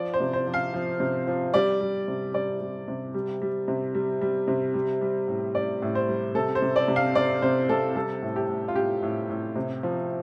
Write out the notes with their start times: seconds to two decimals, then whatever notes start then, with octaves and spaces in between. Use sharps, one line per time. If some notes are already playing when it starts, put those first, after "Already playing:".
Already playing: F3 D5
0.14 C5
0.20 C3
0.33 C5
0.47 F3
0.54 F5
0.74 F3
1.00 C3
1.27 F3
1.54 G3 D5
1.81 G3
2.08 C3
2.34 G3 D5
2.61 G3
2.88 C3
3.14 G3
3.42 G3
3.68 C3
3.95 G3
4.21 G3
4.48 C3
4.74 G3
5.01 G3
5.28 A2
5.55 A2 D5
5.82 A2
5.95 C5
6.08 G3
6.35 C3 A4
6.55 C5
6.62 C3
6.76 D5
6.88 C3
6.96 F5
7.15 C3 D5
7.42 C3 C5
7.69 C3 A4
7.96 G3 A4
8.22 A2
8.36 G4
8.49 A2
8.68 F4
8.76 A2 G4
9.03 A2
9.30 A2
9.56 C3
9.83 F3